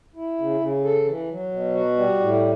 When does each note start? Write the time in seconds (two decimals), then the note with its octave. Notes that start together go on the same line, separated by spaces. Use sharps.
0.15 E4
0.38 C#3
0.60 C#3
0.84 A4
1.06 E3
1.29 F#3
1.51 B2
1.75 F#4
1.97 G3
2.20 A2